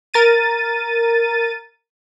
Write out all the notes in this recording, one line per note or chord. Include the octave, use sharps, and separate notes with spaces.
A#4 A6 D#7